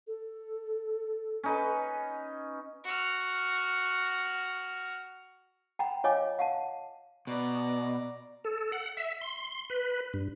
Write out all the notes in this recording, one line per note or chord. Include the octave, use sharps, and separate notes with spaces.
A4
C#4 D#4 B4
F#4 F6
F#5 G5 A#5 B5
F4 C#5 D#5 F5 G#5 D6
F5 F#5 A5
B2 D5 A#5
A4
F#5
E5
C6
B4
G2